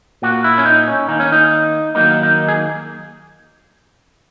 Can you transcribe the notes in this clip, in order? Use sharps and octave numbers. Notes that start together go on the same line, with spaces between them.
A#2 A#3 F#4
E4
C#4
D#4
C#4
D#3 A#3 D#4
C#4
D#4
D#3 F#3 A#3 D#4
D#4
G#4